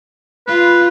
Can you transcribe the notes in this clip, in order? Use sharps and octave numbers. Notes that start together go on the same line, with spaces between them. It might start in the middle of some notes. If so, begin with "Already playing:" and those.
F4 B4